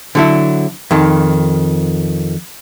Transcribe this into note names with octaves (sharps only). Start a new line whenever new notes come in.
D3 F#3 E4
F2 D#3